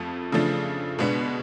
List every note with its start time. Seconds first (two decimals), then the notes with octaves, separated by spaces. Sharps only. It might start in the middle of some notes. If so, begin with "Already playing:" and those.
Already playing: F2 F3 A3
0.32 C#3 F3 A3 D4
0.99 B2 G#3 B3 D4